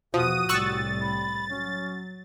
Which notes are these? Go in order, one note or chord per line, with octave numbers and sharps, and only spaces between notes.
E2 B2 F3 F#4 D#6 D#7
C2 A2 G3 C#6 E6 F#6 A6
B5
F#3 C#4